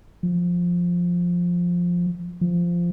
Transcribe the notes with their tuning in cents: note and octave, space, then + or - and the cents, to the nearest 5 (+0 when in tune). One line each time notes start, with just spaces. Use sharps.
F3 +5
F3 -10